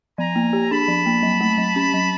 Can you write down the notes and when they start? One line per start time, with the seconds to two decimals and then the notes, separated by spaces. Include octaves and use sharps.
0.18 F3 G#5 A#5
0.36 A#3
0.53 G4
0.70 D4 A5 B5
0.88 F3
1.06 A#3
1.23 F#3
1.41 A3
1.58 F#3
1.76 C#4
1.94 F#3